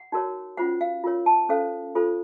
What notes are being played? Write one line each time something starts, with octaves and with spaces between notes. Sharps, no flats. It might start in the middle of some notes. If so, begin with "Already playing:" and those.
Already playing: F#5
D#4 F#4 A#4 C#5
C#4 F4 C5 F#5
F5
F4 A#4 C#5
A5
C#4 A4 C5 F5
F4 A4 C5